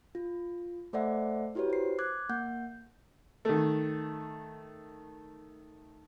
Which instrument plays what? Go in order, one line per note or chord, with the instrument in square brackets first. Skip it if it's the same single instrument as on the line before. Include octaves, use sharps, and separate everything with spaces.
[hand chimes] F4
A3 A4 C5 D5 E5 F#5
E4 F#4 G4 B4 C#5
C5 C7
D6 F#6 G#6
A#3 F#5 G6
[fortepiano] D#3 A3